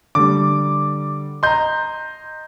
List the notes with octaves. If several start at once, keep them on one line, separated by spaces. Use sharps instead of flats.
D3 G3 D6
D#5 A#5 C6 G6